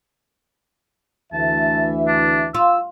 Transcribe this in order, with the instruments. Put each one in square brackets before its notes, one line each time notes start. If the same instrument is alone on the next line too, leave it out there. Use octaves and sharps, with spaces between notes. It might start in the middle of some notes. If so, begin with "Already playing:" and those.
[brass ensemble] D2 E3 E5 [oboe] A5
[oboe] D4
[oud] F4 [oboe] E6